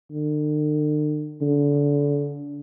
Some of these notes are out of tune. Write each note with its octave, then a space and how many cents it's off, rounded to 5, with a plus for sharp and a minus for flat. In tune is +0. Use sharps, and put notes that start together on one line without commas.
D3 +45
D3 -30